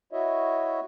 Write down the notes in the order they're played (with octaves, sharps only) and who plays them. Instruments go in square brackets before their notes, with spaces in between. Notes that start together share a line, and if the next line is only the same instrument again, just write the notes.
[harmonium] E4 F#4 C#5 D#5 E5